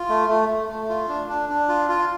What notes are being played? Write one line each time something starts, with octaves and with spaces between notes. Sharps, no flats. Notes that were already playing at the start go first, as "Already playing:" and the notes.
Already playing: F4
A3
A3
A3
A3
F4
D4
D4
D4
F4
F4